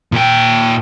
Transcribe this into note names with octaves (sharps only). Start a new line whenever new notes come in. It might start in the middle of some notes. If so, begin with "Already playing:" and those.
A#2 G5